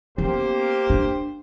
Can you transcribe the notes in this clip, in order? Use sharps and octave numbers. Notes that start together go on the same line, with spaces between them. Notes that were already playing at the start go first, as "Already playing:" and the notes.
A#3 B3 C#4 G4 C5
D4